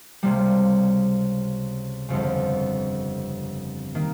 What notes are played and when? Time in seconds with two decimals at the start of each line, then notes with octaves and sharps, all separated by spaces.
0.23 C#2 C3 G3 A#3
2.09 G1 F2 C#3
3.95 D#3 A#3